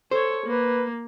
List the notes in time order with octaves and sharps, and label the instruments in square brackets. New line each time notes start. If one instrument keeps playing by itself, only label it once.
[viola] A4 C#5 [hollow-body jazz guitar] C5
[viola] A#3 [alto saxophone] B4